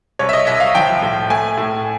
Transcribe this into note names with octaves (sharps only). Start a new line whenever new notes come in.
C2 C#5
E5
D#5
C2 E5
F5
F3 G5
A2
A3 G#5
A2